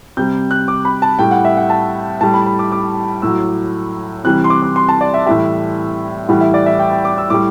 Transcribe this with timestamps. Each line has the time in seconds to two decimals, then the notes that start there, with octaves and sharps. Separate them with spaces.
0.17 C3 G3 G6
0.51 F#6
0.68 D6
0.85 B5
1.02 A5
1.19 A2 G3 G5
1.31 F#5
1.45 E5
1.57 F#5
1.70 A5
2.21 A2 G3 A5
2.34 B5
2.46 B5
2.59 D6
2.72 D6
3.22 A2 F#3 E6
4.24 C3 E3 G3 F#6
4.44 C6
4.50 D6
4.63 D6
4.76 C6
4.89 A5
5.01 D5
5.14 E5
5.26 A2 E3 G3 E5
6.28 A2 E3 G3 F#5
6.41 E5
6.54 D5
6.66 E5
6.79 G5
6.92 G5
7.05 D6
7.18 E6
7.30 A2 G3 D6